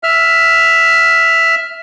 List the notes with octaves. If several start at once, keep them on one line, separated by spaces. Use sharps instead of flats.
E5 F6